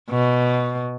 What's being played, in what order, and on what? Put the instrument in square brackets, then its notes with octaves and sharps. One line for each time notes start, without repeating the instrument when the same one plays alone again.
[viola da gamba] B2